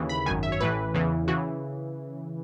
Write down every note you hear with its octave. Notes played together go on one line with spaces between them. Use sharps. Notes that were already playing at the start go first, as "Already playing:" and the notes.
Already playing: D#2 C#3 E3
B5
G#1 F#2 D#3 G#5
E5
C#5
A1 A2 E3 B4
E2 C#3 E3
C#3 E3 F#4